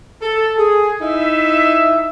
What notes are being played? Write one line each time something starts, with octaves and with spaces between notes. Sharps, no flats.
A4
G#4
D#4 E4 E5